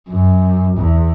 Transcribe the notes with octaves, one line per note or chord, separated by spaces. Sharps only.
F#2
E2